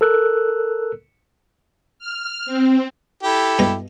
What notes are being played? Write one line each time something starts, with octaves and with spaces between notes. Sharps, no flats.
A4 A#4 E6 F#6
F6
C4
E4 G4 A4
G2 B2 A#5